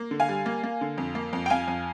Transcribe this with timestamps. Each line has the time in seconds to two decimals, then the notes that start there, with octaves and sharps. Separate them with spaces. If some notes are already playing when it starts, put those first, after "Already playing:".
Already playing: A#3
0.11 D3
0.20 F5 G#5
0.29 G3
0.46 A#3
0.63 A#3
0.81 D3
0.98 F2
1.15 A#3
1.33 F2
1.46 G5
1.50 F2 F5 G#5
1.68 F2